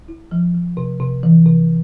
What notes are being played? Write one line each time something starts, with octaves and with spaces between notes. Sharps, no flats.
E4
F3
F3
C3
C3
E3
C3